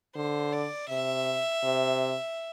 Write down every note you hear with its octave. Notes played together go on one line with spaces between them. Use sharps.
D3 C5
D5
C3 E5
C3